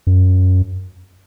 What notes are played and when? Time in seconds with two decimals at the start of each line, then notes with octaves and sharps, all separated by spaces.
0.07 F#2